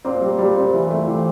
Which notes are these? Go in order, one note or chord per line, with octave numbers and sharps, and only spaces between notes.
A#2 A#3 C4
G3
A#2 G3 A#3
C4
E3
A3
C3 E3 C4